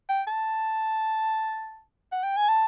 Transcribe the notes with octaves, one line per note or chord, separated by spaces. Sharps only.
G5
A5
F#5
G5
G#5
A5